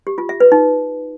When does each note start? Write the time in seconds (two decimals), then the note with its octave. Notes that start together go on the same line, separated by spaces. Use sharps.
0.07 G4
0.18 F4
0.29 E5
0.40 B4
0.52 D#4